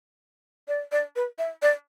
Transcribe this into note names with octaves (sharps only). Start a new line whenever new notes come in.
D5
D5
B4
E5
D5